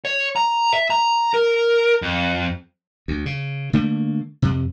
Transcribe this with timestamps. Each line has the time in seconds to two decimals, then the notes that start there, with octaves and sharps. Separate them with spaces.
0.05 C#5
0.36 A#5
0.73 E5
0.90 A#5
1.34 A#4
2.02 F2
3.08 D2
3.26 C#3
3.73 D3 A3 A#3
4.42 F2 C3